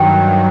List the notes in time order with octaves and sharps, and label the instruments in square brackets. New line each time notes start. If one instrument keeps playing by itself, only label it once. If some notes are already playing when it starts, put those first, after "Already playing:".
Already playing: [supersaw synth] G2 D#3 F#3 [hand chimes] G5